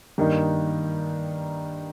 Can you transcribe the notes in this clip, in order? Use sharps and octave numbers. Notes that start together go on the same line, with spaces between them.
G2 D#3 A#3 D#4